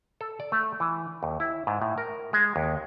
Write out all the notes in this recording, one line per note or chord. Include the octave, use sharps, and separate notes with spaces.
A4
D5
A3
E3
D#2
E4
G#2
A2
A#4
G#3
D#2